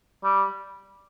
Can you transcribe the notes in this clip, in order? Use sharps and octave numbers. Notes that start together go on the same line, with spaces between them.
G3